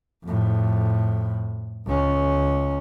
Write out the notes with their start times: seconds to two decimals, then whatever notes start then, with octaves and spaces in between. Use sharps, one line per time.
0.25 F2 A2
1.87 C#2 C#4